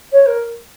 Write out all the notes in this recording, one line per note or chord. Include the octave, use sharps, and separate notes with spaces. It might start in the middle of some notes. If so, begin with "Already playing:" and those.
C#5
A#4